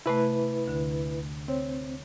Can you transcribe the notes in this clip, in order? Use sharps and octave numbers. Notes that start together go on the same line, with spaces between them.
C3 A3 E4 B4
D2 D3
C4 C#5